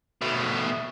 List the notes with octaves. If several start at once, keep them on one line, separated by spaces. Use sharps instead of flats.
B2 A3